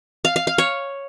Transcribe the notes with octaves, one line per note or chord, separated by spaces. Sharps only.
F5
F5
F5
C#5